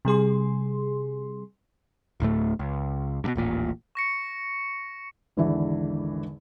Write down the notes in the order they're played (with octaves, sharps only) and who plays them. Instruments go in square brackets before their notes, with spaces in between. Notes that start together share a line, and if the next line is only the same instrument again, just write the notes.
[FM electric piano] C3 G3 G#4 C6
[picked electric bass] D1 D2 A2 A3
C#2
G2 B2
D#1 A1 A#2
[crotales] C#6 A#6 C#7
[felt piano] G#1 E2 D3 E3 E5